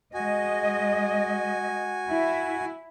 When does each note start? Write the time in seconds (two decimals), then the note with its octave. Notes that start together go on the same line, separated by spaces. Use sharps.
0.14 G#3 F#4 D#5 G#5
2.08 E4